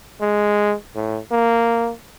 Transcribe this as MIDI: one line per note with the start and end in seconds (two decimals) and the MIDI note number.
0.21 0.75 56
0.95 1.19 45
1.32 1.91 58